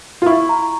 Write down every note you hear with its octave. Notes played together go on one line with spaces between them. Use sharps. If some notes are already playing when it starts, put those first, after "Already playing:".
F4
E4 C#6
A#5